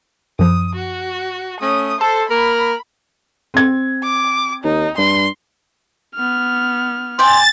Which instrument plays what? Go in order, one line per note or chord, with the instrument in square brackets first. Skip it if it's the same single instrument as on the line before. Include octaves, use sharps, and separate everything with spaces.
[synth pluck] F#2 F3 [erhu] D#6
[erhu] F#4
[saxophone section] A3 C#4 [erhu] D#6
[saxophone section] A4 [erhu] C5 [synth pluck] A5
[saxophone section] A#3 A#4 [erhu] B5
[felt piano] C4 G#6
[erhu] D6
[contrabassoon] D#2 [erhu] D#4
[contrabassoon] G2 [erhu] C6
[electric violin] B3 F6
[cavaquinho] D5 G5 G#5 [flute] C6 [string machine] A6